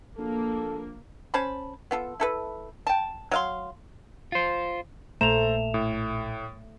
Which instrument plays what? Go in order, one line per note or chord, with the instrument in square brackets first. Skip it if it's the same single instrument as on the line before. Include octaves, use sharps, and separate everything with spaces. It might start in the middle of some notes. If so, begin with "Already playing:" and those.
[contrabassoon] A#1 [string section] A#3 [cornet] A4
[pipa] C#4 C5 A5 B5
B3 F4 A4
E4 A4 B4
G5 A5
F#3 F5 C6
[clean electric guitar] F4 C5
[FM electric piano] A#1 A#2 [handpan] A3 [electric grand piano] A4 C5 A#5 [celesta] E7 F7
[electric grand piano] A2